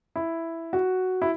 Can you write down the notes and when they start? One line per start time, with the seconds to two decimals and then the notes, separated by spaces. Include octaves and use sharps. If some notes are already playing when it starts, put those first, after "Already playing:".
0.16 E4
0.73 F#4
1.22 E4